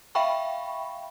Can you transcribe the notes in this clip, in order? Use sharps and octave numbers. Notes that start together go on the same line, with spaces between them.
E5 F5 G5 B5 C#6